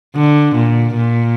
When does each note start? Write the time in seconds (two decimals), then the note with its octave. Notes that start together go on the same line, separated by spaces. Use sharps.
0.16 D3
0.55 A#2
0.95 A#2